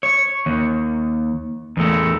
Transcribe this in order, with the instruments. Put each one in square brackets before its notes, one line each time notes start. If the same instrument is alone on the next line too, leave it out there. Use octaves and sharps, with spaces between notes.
[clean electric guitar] C#5
D#2
E2 A3